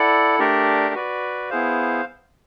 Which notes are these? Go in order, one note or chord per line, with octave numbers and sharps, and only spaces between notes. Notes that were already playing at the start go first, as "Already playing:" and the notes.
Already playing: E4 A4 D5 F#5
A3 D4 G4 A#4 D5
F#4 B4 D5
B3 E4 G#4 C5 F5